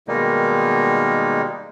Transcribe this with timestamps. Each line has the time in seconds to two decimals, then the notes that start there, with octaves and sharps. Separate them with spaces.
0.08 B2 D#3 G3 G#3 A#3 D#4